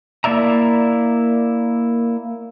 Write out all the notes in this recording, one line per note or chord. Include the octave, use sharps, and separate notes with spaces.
A#3 E4 D5 E5 A#5